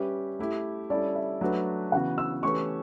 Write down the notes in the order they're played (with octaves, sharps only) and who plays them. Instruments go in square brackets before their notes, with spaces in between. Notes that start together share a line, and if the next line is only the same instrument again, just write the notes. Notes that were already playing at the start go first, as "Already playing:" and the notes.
Already playing: [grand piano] G3 C#4 G4 B4 [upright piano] E5
[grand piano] A3 E4 G4
[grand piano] G3 C#4 E4 A4 [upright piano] D5
[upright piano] E5
[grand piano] F#3 A3 D4 F#4 B4
[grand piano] C#3 E3 B3 F#4 [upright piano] F#5
[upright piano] E6
[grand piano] E3 A3 C#4 G4 B4 [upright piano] C#6